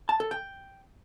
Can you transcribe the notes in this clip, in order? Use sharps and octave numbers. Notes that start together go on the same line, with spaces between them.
A5
A4
G5